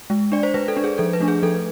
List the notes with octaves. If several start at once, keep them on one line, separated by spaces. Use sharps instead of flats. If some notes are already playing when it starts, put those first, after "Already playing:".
G#3
D4 D5
C5
G#3 B4
A4
D4
G#4
F3 A4
B4
A3 D4
G#4
F3 A4